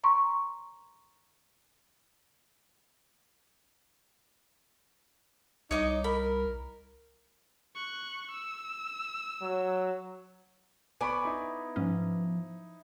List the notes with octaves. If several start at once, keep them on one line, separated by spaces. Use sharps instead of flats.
A#5 C6 C#6
C2 D#4 C#5 D#5 D6
A#4 B5
C#6 F#6
E6
F#3
B3 D5 G#5 B5 C#6
D#4 E4
G#2 F3 C#4